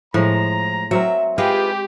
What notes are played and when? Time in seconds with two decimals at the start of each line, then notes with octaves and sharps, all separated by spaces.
0.14 A2 F3 G#3 A#5
0.91 F#3 C4 A#4 E5
1.38 G#3 F4 G4 G#4 B4